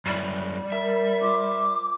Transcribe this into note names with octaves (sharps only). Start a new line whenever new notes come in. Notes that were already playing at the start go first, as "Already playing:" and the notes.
F#2 G3 E4
A#4 E5
F4 C5 D6